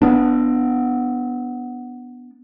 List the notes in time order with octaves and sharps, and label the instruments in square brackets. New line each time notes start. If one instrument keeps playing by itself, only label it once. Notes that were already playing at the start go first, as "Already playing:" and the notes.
[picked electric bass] B3 D4